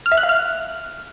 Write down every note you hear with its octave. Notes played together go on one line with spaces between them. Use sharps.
F6
E5
F#6
F5
F6